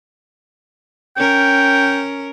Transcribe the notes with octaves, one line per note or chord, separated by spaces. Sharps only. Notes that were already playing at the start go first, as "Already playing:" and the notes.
C#4 A#4 G5